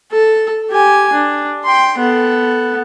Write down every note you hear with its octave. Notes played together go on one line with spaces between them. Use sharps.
A4
G4 G#5
D4
G5 C6
B3 A4